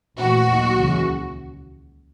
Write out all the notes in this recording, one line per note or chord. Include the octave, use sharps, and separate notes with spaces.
A#1 A2 E3 F#4
D#2 D#3 F#3
C#2 C#3 E3